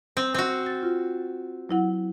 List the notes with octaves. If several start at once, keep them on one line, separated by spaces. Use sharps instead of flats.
C4
C4 F#4
A6
F4
F#3 E4 F#5